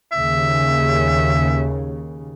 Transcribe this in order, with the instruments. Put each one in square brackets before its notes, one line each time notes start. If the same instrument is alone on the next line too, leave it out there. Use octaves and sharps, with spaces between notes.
[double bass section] D#2 C#3 [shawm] E5